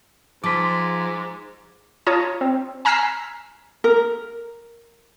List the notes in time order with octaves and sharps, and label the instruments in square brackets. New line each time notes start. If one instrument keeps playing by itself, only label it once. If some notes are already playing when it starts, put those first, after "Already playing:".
[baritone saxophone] G#2 [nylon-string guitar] F3 [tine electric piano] D6 B6
[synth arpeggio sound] F4 C#5 A5 A#5 D#6
C4
G#5 A#5 E6 F6 B6 C7
[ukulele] A#4